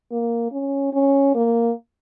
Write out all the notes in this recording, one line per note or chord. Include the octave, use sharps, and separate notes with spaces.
A#3
C#4
C#4
A#3